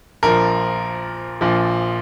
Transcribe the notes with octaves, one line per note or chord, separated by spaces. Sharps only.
A#1 A#2 F3 A#4
A#1 A#2 F3